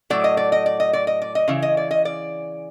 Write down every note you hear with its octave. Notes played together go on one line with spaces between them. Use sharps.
A2 F#3 A3 D5
D#5
D5
D#5
D5
D#5
D5
D#5
D5
D#5
C#3 E3
D#5
D5
D#5
D5